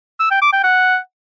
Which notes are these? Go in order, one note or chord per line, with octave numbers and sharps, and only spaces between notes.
E6
G5
D6
G5
F#5